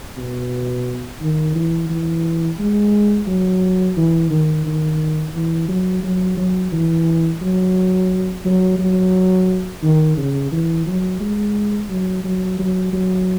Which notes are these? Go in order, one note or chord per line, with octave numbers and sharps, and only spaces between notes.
B2
D#3
E3
E3
G#3
F#3
E3
D#3
D#3
E3
F#3
F#3
F#3
E3
F#3
F#3
F#3
D#3
C#3
E3
F#3
G#3
F#3
F#3
F#3
F#3